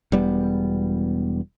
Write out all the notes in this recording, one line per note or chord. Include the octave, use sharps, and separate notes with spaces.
E1 G3 B3